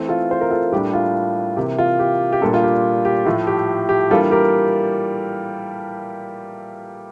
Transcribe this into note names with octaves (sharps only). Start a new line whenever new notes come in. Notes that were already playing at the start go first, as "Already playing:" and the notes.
Already playing: E3 A3 C4
F4 A4
C5
A#4
F4 A4
A2 G3 A#3 D4 G4
F4
C3 E3 A#3 G4
F4
G4
G4
A#2 G3 A#3 D4 F4 A4
F4
G4
G4
A2 F3 A3 F4
G4
G4
E3 G3 A#3 D4 F4 A4
G4 A#4